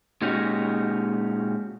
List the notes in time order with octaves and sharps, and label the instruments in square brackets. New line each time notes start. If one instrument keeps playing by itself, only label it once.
[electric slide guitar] A#2 G#3 C#4 D#4 F#4 G4